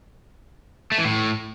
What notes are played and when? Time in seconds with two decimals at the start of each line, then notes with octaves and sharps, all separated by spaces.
0.92 A3
0.98 E3
1.05 A2